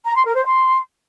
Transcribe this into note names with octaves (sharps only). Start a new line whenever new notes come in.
A#5
C6
A#4
C5
C6